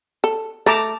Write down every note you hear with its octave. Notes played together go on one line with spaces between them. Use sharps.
A4
A3 A5 A#5 D6